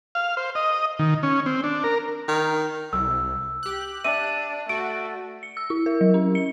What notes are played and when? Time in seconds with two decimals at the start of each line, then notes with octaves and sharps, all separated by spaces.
0.15 F5
0.37 C5
0.55 D#5
0.99 D#3
1.23 C#4
1.46 C4
1.64 D4
1.84 A#4
2.28 D#3
2.93 C2 E6
3.63 G4 F#6
4.04 D4 E5 D6 E6 D#7
4.69 A3 F#4 D7
5.43 C#7
5.57 E6
5.70 E4
5.86 A#4
6.01 F#3
6.14 C#4
6.35 C#7